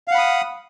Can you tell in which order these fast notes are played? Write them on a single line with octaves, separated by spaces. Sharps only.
F5 F#5 B5 D#6